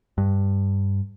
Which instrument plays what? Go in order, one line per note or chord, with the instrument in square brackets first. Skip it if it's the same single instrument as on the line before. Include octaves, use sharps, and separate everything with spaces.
[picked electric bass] G2